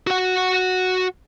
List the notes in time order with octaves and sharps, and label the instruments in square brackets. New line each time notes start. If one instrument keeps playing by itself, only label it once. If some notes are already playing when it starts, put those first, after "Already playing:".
[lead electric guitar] F#4 F#5